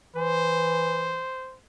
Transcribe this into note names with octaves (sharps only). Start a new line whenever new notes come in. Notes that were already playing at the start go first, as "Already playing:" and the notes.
E3 C5